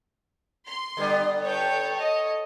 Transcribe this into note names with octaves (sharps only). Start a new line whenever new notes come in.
C6
D3 G3 B3
A4 B4 C#5 G5
D#5